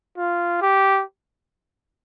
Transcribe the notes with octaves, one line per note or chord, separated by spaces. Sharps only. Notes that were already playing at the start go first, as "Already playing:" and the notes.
F4
G4